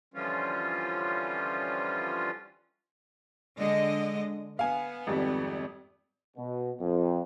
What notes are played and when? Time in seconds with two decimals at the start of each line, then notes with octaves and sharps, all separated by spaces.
0.14 D3 E3 F3 G3 C#4 F4
3.59 D3 G#3 D#5
4.59 B3 F5 G#5
5.07 G#1 F2 G3
6.37 B2
6.80 F2